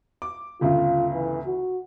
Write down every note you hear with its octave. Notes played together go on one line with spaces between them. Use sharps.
D6
G1 D2 C#3 F4
E3
F#4